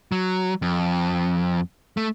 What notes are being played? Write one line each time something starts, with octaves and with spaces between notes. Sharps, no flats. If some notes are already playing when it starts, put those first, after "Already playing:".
F#3
F2
A3